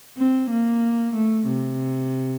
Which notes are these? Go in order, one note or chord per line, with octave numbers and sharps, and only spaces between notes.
C4
A#3
A3
C3